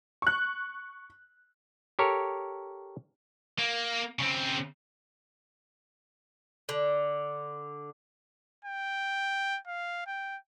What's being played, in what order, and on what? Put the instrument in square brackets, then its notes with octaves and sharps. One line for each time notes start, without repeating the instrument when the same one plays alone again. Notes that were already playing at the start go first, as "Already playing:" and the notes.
[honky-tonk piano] C#6 F#6
[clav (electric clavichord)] G4 A4 A#4 C#5
[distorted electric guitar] A#3
C#3 C4
[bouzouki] D3
[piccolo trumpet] G5
F5
G5